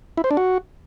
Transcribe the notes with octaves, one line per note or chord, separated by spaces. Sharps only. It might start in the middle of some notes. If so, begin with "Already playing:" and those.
E4
C5
D4
F#4